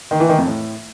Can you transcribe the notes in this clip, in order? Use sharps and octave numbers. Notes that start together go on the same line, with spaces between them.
D#3
E3
D#3
F2
A2